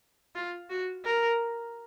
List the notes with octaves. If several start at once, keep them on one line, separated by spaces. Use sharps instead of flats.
F4
F#4
A#4